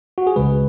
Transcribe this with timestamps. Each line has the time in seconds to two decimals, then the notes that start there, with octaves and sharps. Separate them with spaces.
0.18 F#4
0.27 G#4
0.36 C#2 C#3 G#3 B4